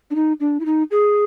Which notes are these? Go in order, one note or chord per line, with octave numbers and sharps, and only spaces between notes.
D4
D#4
D4
E4
D#4
G#4